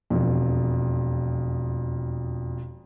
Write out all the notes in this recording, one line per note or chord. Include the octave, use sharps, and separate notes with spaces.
E1 F2